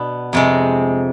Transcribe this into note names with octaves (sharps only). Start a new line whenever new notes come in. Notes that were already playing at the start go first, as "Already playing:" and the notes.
Already playing: B2 B3 D4
F2 C3 G#3